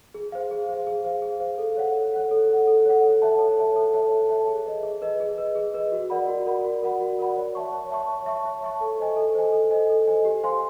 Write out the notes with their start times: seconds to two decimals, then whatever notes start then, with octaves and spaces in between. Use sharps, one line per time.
0.14 G#4
0.32 C5 F5
0.51 G#4
0.69 C5 F5
0.87 G#4
1.04 C5 F5
1.22 G#4
1.40 C5 F5
1.58 A4
1.77 C#5 F#5
1.95 A4
2.14 C#5 F#5
2.31 A4
2.49 C#5 F#5
2.67 A4
2.86 C#5 F#5
3.04 A4
3.22 C#5 E5 A5
3.39 A4
3.57 C#5 E5 A5
3.76 A4
3.93 C#5 E5 A5
4.11 A4
4.29 C#5 E5 A5
4.48 G#4
4.66 B4 D#5
4.83 G#4
5.02 B4 D#5
5.20 G#4
5.38 B4 D#5
5.55 G#4
5.74 B4 D#5
5.92 F#4
6.10 A#4 D5 F#5 B5
6.28 F#4
6.46 A#4 D5 F#5 B5
6.65 F#4
6.82 A#4 D5 F#5 B5
7.01 F#4
7.19 A#4 D5 F#5 B5
7.37 C#5
7.55 E5 A5 C#6
7.72 C#5
7.91 E5 A5 C#6
8.09 C#5
8.26 E5 A5 C#6
8.45 C#5
8.63 E5 A5 C#6
8.81 A4
8.99 C5 D#5 G#5
9.16 A4
9.35 C5 D#5 G#5
9.53 A4
9.71 C5 D#5 G#5
9.89 A4
10.07 C5 D#5 G#5
10.25 G4
10.43 C5 F5 G#5 C6